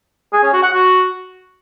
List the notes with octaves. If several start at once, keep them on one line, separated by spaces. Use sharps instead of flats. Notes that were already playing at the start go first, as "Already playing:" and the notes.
G#4
C#4
F#4
F#5
F#4